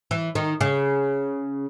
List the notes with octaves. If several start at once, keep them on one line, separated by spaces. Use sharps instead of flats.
E3
D#3
C#3